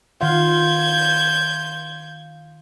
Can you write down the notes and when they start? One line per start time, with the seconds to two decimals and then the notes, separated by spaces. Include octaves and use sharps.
0.21 D#3 F4 F5 F#5 G6 G#6